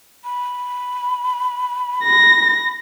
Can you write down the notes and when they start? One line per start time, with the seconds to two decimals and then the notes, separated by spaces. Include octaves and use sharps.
0.24 B5
2.04 A#6